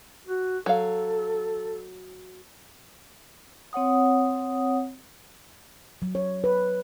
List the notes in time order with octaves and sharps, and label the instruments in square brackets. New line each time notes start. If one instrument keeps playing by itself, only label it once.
[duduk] F#4
[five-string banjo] F#3 F5 [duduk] A4
[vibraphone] C4 C#5 F#5 D#6
[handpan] F#3
C#5
B4